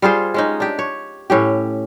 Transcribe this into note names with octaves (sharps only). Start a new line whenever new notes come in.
G3 F4 G#4 C5
G#3 C#4 D#4
D4 G4
C#5
A2 C#4 G4